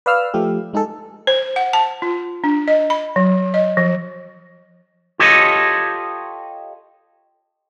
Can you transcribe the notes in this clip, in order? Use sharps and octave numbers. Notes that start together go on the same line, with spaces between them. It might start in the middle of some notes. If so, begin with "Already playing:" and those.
B4 D5 F5 E6 F6
F3 A3 G4
G#3 D#4 G#4 A4
C5
F#5
A5
F4
D4
D#5
B5
F#3
D#5
F3
F4 G4 A4 C#5 D#5